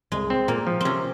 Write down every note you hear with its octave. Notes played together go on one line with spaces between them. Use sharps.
C2 G#3
C4
A#2 A#3
F3
C3 C4 C#4